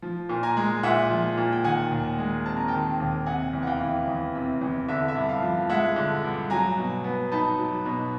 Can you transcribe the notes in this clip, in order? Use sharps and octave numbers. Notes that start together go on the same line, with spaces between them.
F3
A#2
G#5 A#5
G#3
A#2 E5 F#5
F3
A#2
G5
D#3 F#5 G#5
D#2
G#3
C4 A5
A#5
D#3 G5 A5
D#2
C3 F#5 G#5
E2
F#5
F5 G5
E3
E2
C3
E2
D3 E5
E5
G2
F5
F3
G#3 E5 F#5
D3
G2
F#3 G#5 A#5
B2
B3
D#4 A5 B5
F#3
B2